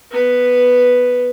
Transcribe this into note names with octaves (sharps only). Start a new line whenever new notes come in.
B3 B4